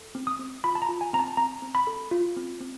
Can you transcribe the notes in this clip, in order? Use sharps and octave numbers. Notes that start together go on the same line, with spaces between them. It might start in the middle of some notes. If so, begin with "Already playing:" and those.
Already playing: A4
C4
D#6
C4
F4 B5
A5
A#5
F4
G#5
C4 A#5
A5
C4 A#5
C4
B5
A4
F4
C4
C4